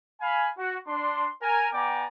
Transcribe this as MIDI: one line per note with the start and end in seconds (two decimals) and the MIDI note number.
0.21 0.49 77
0.21 0.49 80
0.21 0.49 83
0.58 0.76 66
0.87 1.29 62
0.87 1.29 84
1.42 1.68 70
1.42 1.68 80
1.73 2.05 59
1.73 2.05 74
1.73 2.05 79
1.73 2.05 80
1.73 2.05 82
1.73 2.05 86